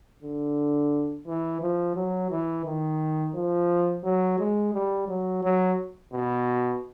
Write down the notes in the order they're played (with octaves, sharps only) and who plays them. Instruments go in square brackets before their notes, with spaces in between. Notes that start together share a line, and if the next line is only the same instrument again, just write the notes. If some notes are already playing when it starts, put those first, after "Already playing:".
[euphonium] D3
E3
F3
F#3
E3
D#3
F3
F#3
G#3
G3
F#3
F#3
B2